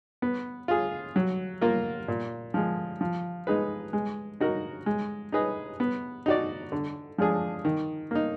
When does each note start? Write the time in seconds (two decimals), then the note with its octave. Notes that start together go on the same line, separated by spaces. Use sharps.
0.22 B3
0.68 F4 G#4
1.16 F#3
1.61 A#3 F4 A#4
2.08 A#2
2.54 F3 G#3
3.01 F3
3.47 G#3 D#4 G#4 B4
3.93 G#3
4.40 D#4 F#4 A#4
4.86 G#3
5.32 D#4 G#4 B4 D#5
5.80 B3
6.26 D#4 F#4 D5
6.72 D3
7.18 F3 G#3 D4 G#4
7.65 D#3
8.11 A#3 D#4